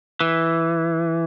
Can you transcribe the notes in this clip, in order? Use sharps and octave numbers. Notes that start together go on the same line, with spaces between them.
E3